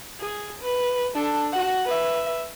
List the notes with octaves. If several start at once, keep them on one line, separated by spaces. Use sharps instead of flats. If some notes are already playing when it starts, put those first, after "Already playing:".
G#4
B4
D4 A4
F#4 F#5
B4 E5